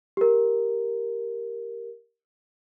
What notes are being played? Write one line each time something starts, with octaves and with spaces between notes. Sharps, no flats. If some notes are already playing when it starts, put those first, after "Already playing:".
G4 A#4